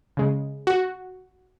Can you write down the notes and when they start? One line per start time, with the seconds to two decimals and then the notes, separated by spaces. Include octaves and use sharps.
0.17 C#3 G#3
0.67 F#4